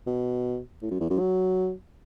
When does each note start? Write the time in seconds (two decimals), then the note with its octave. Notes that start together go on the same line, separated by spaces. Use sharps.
0.07 B2
0.82 A2
0.91 F#2
1.00 E2
1.10 F#2
1.19 F#3